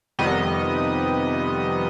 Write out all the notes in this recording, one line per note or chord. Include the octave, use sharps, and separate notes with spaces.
F2 C3 D#3 G3 B3 D#5